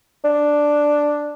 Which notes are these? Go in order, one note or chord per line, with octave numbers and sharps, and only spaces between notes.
D4